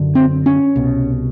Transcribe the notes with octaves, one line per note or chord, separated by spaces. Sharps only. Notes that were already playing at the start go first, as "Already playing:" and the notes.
Already playing: F#2 D3
C4
C#4
C2 B2